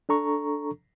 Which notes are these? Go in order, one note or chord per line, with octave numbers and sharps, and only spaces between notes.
D4 A4 A#5 C#6